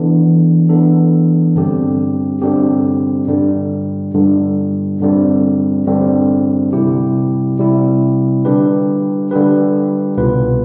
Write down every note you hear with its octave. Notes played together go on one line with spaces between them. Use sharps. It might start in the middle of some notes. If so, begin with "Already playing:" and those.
Already playing: E3 B3 D4 A4
E3 B3 D4 A4
G2 D3 G3 C4 G4
G2 D3 G3 C4 G4
G2 D3 G3
G2 D3 G3
G2 D3 G3 C4
G2 D3 G3 C4
C3 G3 C4 E4 G4
C3 G3 C4 E4 G4
D3 G3 D4 G4 B4
D3 G3 D4 G4 B4
C2 B2 B3 F4 B4